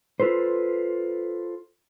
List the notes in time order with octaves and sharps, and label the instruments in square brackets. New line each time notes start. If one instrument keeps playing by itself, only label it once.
[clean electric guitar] F4 A4 B4 C5